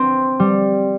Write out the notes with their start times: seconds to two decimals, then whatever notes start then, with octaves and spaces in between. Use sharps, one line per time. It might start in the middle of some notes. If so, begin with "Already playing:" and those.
Already playing: C4
0.40 G3